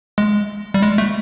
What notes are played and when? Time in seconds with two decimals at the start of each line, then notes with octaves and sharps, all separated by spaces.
0.18 G#3
0.74 G3
0.82 G#3
0.98 A3